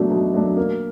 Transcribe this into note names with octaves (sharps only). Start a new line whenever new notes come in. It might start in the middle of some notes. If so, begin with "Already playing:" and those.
Already playing: B2 F#3 A3 D4
B2
F#3 A3 D4
A#3